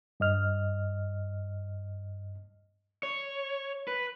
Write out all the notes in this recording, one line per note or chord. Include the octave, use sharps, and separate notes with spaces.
G2 D#5 F6
C#5
B4